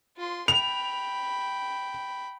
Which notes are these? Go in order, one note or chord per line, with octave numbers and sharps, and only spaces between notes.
F4 C6
G5 B5 F7